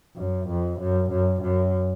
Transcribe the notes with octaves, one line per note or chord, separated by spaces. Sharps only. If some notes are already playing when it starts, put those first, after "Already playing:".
F#2
F2
F#2
F#2
F#2